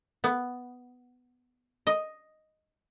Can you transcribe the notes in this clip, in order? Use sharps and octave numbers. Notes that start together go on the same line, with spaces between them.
B3
D#5